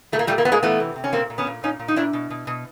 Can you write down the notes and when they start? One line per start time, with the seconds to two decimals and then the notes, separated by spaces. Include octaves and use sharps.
0.12 A#2 A3
0.19 A#3
0.27 A#2 G3 A3
0.38 A#3
0.45 A#2 B3
0.52 G#3 A#3
0.63 E3 A3 B3
0.80 C3
0.96 C3
1.04 C#4
1.12 A#2 A#3 C4
1.30 A#2
1.38 B3 C#4
1.47 A#2
1.63 A#2 C#4 D#4
1.79 A#2
1.88 D#4
1.96 A#2 D4 E4
2.13 B2
2.30 B2
2.47 B2